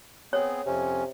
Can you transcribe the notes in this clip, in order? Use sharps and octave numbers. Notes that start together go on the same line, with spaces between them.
B3 C4 G#4 C#5
F2 C3 C#4